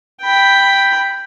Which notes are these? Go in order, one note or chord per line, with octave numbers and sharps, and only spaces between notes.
G5 B5